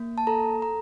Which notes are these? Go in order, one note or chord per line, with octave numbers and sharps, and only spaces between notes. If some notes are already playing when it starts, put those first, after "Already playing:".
Already playing: A#3
A5
A4 A#5
A#5